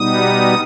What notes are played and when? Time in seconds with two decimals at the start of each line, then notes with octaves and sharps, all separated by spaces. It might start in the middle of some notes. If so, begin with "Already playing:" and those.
Already playing: B2 G3 B3 D#4 D#6